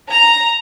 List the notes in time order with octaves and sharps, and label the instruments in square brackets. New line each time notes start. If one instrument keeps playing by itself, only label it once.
[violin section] A#5